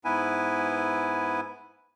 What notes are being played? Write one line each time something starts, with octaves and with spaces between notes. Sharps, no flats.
G#2 B3 E4 B4 G#5